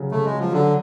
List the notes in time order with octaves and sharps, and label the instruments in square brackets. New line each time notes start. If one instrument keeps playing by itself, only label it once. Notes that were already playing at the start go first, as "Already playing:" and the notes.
Already playing: [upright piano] C#3 F#3
[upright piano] C#3 [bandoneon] A3
[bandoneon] G#3
[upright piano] F#3
[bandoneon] F3
[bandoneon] D3 [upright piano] F#3